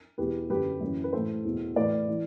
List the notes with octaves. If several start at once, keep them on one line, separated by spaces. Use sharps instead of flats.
E2 B2 G4 B4
F#2 D3 G4 B4
F#2 E3
B4
A2 E3 A4 C5
E2 B2
A2 E3 B4 D5
E3